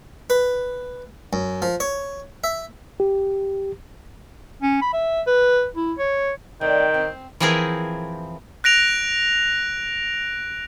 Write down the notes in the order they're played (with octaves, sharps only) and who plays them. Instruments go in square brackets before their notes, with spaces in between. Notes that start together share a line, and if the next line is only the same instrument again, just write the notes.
[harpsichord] B4
F#2
F3
C#5
E5
[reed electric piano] G4
[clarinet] C#4
B5
E5
B4
E4
C#5
[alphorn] D#3 [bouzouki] A3 C4 D4 [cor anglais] G5
[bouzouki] C4
[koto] E3 F3 C4 E4 G#4 A#4
[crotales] F#6 A#6 D7 F7